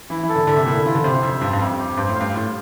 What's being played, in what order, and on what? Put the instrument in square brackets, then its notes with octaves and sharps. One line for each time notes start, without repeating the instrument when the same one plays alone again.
[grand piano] E3 [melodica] E4
[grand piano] E3
[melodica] A4
[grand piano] D3
[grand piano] D3 [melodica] E5
[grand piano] C3
[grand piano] A#2 [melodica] E4
[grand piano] D3
[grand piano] E3 [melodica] F4
[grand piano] D3
[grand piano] C3 [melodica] C5
[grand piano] F2 [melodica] E5
[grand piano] G2 [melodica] F4
[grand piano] G2
[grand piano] F2 [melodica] C4
[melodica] G4
[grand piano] G2 [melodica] C5
[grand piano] A2
[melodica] F5
[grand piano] G2
[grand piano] A2 [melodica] F4